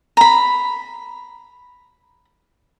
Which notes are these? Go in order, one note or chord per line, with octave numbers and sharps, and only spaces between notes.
A#5 B5